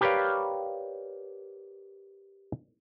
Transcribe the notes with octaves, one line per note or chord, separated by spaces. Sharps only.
G4 A#4 B4 C#5 D5 F5